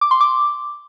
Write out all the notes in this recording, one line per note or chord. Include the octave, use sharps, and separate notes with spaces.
D6
C6
D6